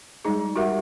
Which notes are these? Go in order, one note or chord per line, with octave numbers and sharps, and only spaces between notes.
G3 G#3 D#4 G#4
F#4 G4 A#4 E5 F#5